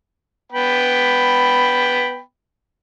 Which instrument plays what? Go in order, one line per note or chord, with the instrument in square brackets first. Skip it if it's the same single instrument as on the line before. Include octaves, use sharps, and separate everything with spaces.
[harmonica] B3 G5 B5